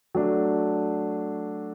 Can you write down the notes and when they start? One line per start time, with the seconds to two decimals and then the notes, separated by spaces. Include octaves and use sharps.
0.15 F#3 A3 D4